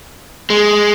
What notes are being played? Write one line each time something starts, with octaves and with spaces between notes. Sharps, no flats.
G#3